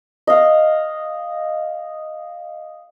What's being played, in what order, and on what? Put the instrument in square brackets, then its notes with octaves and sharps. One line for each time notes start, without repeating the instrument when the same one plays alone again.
[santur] D#5 F5